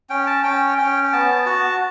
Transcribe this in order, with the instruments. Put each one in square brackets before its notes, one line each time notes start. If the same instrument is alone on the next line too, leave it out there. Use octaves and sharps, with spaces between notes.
[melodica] C#4 G5
A5
C#4 G5
C#4 G5
G5
B3 A5
F#4